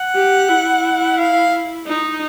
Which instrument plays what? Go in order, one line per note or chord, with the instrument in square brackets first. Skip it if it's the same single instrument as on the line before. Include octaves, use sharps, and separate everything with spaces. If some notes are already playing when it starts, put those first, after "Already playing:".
Already playing: [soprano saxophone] F#5
[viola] G4
E4
[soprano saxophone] F5
[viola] D#4